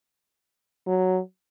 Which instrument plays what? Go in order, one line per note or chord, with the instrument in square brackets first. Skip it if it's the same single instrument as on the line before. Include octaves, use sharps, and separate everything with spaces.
[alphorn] F#3